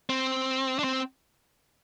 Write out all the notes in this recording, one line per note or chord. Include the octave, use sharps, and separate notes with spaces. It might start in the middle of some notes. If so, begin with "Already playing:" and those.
C4
D4
C4